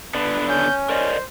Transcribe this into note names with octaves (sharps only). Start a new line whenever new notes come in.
D3 B3 D4 B4
C#4 G6
A#4 C5 D5 D#5